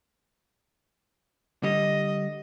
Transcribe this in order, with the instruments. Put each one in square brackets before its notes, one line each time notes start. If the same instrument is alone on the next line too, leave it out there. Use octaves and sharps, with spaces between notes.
[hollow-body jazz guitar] D3 G3 [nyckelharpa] D#5